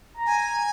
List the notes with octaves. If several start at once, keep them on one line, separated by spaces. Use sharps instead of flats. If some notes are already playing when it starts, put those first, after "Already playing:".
A#5
G#5